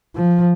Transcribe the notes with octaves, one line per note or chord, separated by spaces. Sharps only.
F3